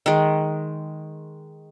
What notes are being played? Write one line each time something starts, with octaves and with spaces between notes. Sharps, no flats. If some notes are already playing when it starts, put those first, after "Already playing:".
D#3 G#3